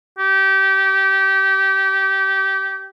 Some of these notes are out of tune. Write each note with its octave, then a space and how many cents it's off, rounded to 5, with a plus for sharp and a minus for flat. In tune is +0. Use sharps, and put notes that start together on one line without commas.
G4 -20